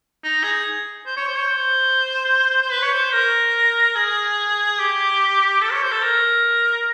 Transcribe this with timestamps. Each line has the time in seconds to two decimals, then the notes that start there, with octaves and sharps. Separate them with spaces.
0.24 D#4
0.43 G#4
1.06 C5
1.17 C#5
1.27 C5
1.37 C#5
1.47 C5
2.62 C5
2.72 B4
2.82 C#5
2.92 C5
3.13 A#4
3.95 G#4
4.79 G4
5.61 A4
5.72 C#5
5.82 C5
5.92 A4
6.03 A#4